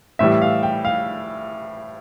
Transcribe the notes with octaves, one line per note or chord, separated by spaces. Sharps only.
A2 E3 G3 E5
F5
G5
F5